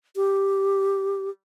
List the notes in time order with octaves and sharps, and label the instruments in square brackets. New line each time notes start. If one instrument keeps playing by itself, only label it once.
[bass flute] G4